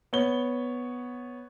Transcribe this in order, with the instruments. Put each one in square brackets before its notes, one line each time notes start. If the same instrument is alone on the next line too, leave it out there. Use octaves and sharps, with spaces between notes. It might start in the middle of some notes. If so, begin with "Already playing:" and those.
[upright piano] B3 C#5 G7